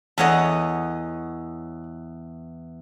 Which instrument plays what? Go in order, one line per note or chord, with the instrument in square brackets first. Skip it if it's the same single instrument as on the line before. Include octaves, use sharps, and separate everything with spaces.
[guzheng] E2 C#5 D#5 [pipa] A4 F#5